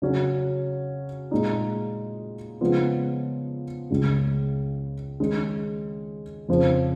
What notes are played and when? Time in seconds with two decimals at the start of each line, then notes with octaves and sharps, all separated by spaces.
0.02 C#3 F#3 C#4
1.31 A#2 G#3 D#4
2.61 C#3 F3 G#3 B3 F4
3.90 C#2 C#3 G#3
5.20 D#3 G#3 C#4
6.49 F2 C#3 F3